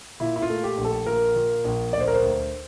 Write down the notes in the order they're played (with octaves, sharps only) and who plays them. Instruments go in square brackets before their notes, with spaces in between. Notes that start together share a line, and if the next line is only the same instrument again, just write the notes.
[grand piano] A#2 E4
E4
F4
A3
G4
A#1
A4
A#2 A#4
A#2
A#1
D2 D5
C5
A#4
C5
D2